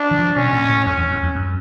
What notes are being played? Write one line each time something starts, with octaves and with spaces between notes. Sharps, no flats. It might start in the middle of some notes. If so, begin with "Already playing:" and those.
Already playing: D4
E3
F3
B2 C#4
A#2
A2
F2 C#4
E2
E2
F2
F#2